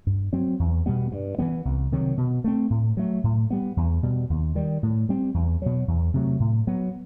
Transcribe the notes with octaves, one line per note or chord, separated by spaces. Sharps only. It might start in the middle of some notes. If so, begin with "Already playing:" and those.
G2
F#3 C4
E2
B2 G3 B3
G2
E3 G3 B3
C2
C3 D#3 F#3
B2
A3 C4
A2
F#3 A3
A2
G3 B3
E2
B2 G3
D#2
D#3 G3
A2
G3 C4
E2
B2 F#3
E2
C3 F#3 A3
A2
F#3 B3